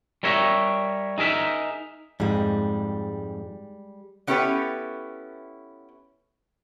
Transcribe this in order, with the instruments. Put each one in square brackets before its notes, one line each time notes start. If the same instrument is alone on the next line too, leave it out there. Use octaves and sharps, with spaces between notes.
[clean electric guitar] G3 A#4 C#5 E5
D#4 G#4 A#4 E5
[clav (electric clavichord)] F2 G#2 [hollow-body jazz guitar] G3 G#3
[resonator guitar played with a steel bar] B3 C#4 E4 G4 A4 B4